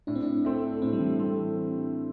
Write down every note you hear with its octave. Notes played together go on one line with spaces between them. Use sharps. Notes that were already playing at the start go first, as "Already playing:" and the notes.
A2 D4
C4
D4
A3 C4 A4
A2 C4
G3
E3
G3 A3 C4 A4